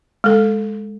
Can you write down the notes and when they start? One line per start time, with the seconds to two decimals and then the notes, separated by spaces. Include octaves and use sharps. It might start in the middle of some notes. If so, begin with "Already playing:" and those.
0.24 G#3 A4